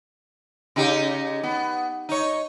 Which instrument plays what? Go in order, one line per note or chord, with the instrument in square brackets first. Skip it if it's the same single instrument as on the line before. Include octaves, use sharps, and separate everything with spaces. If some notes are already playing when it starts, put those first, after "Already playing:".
[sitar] C#3 D#4 G4
B3
D#4 C#5